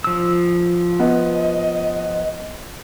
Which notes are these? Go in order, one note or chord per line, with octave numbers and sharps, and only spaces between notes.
F3 E6
B3 D#5